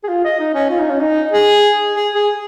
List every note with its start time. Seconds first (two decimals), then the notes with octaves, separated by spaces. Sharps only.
0.04 G#4
0.09 F4
0.24 D#5
0.40 D#4
0.54 C#4
0.70 F4
0.80 D#4
0.90 C#4
1.00 D#4
1.32 G#4
1.95 G#4
2.15 G#4